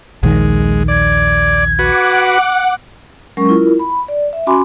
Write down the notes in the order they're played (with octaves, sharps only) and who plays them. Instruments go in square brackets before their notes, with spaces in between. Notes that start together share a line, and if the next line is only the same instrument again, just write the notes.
[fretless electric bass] A#1 D#2 D#3 [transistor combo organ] G#3
[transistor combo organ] D5 [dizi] G#6
[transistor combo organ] F#4 B4 [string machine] F#5 D6
[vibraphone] F#3 G#3 C#4 A#4 C#6
E4 F4 A#4
B5
D5
E5
C#4 F#4 G#5 B5 C6 D6